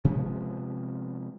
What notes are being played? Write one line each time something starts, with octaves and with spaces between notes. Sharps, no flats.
C3 F3 G#3 B3